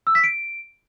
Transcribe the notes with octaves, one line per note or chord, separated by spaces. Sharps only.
E6
B6
D7